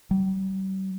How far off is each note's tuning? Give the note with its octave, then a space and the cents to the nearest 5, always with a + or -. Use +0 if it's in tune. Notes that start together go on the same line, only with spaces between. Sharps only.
G3 -40